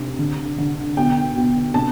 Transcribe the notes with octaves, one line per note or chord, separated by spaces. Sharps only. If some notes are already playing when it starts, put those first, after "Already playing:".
Already playing: C3
D3
D3
B2 G5
B2
C3 A5